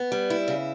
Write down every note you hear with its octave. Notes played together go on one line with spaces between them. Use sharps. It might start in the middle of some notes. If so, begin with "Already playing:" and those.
Already playing: B3
G3
E4
C#3